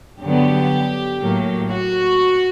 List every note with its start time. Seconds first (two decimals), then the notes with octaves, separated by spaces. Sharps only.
0.23 G2 D3 F#3 B3 G4
1.21 A2 F#3 A#3
1.71 F#4